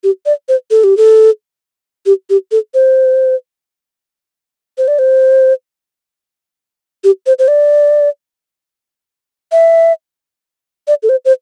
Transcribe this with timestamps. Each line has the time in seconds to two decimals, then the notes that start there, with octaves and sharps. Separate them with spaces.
0.04 G4
0.26 D5
0.49 C5
0.71 A4
0.84 G4
0.97 A4
2.06 G4
2.30 G4
2.52 A4
2.74 C5
4.78 C5
4.88 D5
4.99 C5
7.04 G4
7.26 C5
7.39 C5
7.48 D5
9.52 E5
10.87 D5
11.03 A4
11.09 C5
11.25 C5